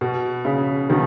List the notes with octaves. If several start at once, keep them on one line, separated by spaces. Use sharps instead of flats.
B2
C#3
B2 D#3